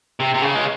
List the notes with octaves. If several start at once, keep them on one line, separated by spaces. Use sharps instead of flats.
C3
C3
C#3
G#3